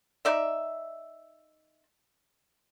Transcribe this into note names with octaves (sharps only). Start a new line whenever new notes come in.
D#4 D5 E5